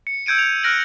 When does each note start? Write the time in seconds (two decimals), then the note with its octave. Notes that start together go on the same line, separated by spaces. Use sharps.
0.07 C#7
0.26 E6 G6 G#6 D7 D#7
0.38 F7
0.63 F6 F#6 A#6 D7 F#7